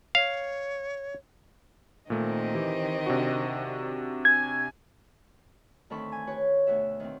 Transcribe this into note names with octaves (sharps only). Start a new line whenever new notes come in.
C#5 F5
A#2 D#3 A3 C4 D#5
E3 G4
C3 D4 F#4
G#5 G#6
D2 D#3 C4 A4 B5 C#6
G#5
G4 B4 C#5
D2 B2 F#4 E5
D#3 C4